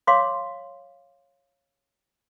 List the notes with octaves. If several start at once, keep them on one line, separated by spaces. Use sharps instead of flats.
C#5 F5 C6 D6